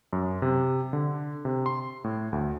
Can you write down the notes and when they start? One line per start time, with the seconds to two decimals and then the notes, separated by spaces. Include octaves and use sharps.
0.13 F#2
0.42 C3
0.93 D3
1.45 C3
1.66 C6
2.04 A2
2.33 D2